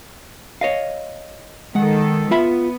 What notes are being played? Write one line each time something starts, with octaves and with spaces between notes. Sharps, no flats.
C#5 D#5 F5
D#3 G#3 A4 F#5
B3 F4 E5 B5